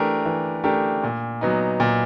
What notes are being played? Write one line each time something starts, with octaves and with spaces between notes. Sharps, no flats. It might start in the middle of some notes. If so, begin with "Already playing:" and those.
Already playing: E3 A3 D4 G4 A#4
E3
A3 D4 G4 A#4
A#2
F#3 B3 D#4
A#2